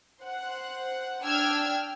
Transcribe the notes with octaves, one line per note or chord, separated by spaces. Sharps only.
C5 F#5
D4 G5 E6 F6 G#6